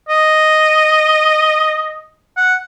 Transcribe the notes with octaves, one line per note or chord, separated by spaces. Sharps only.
D#5
F#5